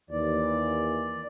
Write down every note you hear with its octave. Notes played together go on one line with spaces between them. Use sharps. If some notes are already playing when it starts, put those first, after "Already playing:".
D#2 E3 D5